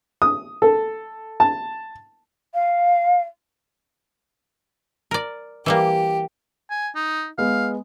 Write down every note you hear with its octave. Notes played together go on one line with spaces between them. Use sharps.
D#6
A4
A5
F5
A#4 D5
E3 G3 A#3 G4
G#5
D#4
G#3 B3 F5